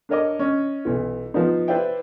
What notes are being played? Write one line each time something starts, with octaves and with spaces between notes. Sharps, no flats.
D4 A#4 C#5 D#5 D6
C#4 D#5
B1 E3
F3 B3 D#4
E4 B4 C5 D5 E5 G5